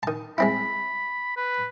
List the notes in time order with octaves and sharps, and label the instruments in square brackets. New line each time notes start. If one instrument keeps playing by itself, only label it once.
[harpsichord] D#3 A5
[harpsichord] G#3 C4 E4 [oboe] B5
[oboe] B4